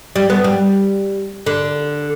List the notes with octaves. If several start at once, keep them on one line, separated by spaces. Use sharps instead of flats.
G3
B3
G3
D3